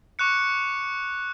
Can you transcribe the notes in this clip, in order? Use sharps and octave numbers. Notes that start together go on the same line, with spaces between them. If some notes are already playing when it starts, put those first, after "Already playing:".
C#6 D6 F#6 C#7